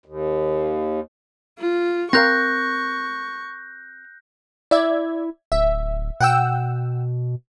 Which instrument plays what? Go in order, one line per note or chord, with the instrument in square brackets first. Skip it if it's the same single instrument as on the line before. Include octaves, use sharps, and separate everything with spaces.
[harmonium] D#2
[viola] F4
[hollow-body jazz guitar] C4 A#4 F5 [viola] C#6 [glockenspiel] F#6 G6 A#6
[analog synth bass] E4 [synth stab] D5 E5 G#6
[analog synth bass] D1 [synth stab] E5
[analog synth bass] B2 [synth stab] F#5 G5 E6